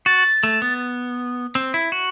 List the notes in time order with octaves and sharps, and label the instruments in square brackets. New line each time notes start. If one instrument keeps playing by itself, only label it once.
[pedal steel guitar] F#4 [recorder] A6
[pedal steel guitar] A3
B3
C4
E4
F#4